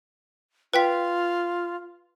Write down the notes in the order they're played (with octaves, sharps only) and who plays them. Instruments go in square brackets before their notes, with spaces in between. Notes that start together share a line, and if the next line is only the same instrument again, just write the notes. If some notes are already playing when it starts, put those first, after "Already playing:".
[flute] F4 [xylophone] B4 G5 B6